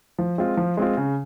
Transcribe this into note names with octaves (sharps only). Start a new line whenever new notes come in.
F3
G#3 C4 F4
F3
G#3 C4 F4
C#3